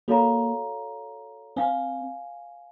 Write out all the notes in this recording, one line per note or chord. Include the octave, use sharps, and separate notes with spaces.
A#3 F#4 A4 C#5 F5 A#5
C4 C5 F5 G#5